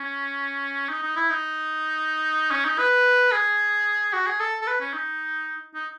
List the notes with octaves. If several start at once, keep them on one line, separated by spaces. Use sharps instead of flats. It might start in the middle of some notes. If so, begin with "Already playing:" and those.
Already playing: C#4
D#4
D#4
E4
D#4
C#4
D#4
B4
G#4
F#4
G#4
A4
A4
B4
C#4
D#4
D#4